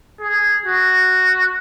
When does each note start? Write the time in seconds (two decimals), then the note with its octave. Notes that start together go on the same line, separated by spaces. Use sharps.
0.20 G#4
0.65 F#4